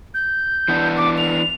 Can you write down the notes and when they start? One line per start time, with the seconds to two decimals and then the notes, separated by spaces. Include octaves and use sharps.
0.14 G6
0.68 E3 B3 D4
0.97 D6
1.18 F7